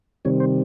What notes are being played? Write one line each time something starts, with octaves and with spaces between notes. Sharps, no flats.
C3 D#3 G3 C4 C#5
C5